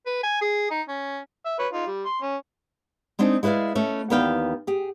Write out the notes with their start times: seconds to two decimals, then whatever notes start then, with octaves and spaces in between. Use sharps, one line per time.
0.06 B4
0.23 G#5
0.41 G#4
0.71 D#4
0.88 C#4
1.46 E5
1.59 B4 C#5
1.73 D#4 F4
1.86 G3
2.05 C6
2.22 C#4
3.19 G#3 C4 D4 D#4
3.43 G#3 E4 B4 D5 F5
3.75 A3 C#4 E5
4.10 D#2 E3 B3 D5 F5 G5
4.67 G4 G#4